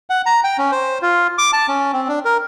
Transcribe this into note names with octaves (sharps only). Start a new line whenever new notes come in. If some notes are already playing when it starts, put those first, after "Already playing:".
F#5
A#5
G5
C#4
C5
F4
D6
A5
C#4
C4
D4
A#4